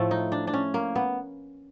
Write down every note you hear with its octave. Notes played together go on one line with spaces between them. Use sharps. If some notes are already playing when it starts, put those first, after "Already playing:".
Already playing: A2 F3 A3
D#4
D4
D4
C#4
A#3
B3